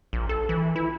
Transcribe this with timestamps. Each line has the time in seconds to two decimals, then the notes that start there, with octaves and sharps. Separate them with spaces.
0.13 A#1
0.29 A4
0.49 E3
0.76 E4